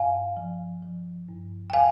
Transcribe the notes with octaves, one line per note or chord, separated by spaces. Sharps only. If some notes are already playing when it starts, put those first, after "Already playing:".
Already playing: G2 F5 G#5
F3
F3
G2
G5
F5 G#5